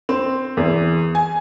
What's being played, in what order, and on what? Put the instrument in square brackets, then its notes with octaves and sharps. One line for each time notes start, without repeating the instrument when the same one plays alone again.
[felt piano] C4
E2
G#5